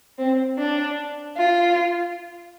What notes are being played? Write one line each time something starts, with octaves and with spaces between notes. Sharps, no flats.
C4
D4
F4